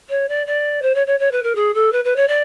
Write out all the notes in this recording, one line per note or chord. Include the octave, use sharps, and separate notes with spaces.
C#5
D5
D5
C5
C#5
C#5
C#5
B4
A#4
G#4
A4
B4
B4
C#5
D5